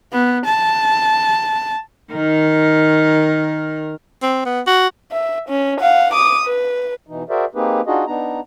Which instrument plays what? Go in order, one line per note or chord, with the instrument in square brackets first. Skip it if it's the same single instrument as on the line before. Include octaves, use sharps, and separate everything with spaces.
[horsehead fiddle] B3
A5
[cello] D#3 A#4
[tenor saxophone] C4
B3
F#4
[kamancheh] E5
C#4
F5 F#5
D6 D#6
B4
[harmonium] B2 E3 D#4
F#4 G#4 A#4 C5 D5 E5
A#3 C4 D#4 G4 G#4 B4
D4 D#4 F4 F#4 G#4 D#5
B3 D4 D#4 A#5